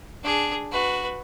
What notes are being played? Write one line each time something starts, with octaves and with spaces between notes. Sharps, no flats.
D4 G#4
F#4 B4